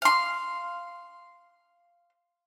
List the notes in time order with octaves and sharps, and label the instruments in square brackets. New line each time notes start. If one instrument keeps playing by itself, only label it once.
[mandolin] F5 C6